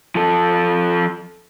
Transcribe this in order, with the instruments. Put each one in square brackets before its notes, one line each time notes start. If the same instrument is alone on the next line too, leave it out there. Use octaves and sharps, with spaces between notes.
[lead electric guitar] F3 A4